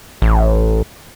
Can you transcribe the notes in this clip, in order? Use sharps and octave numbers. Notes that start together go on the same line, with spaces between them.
A1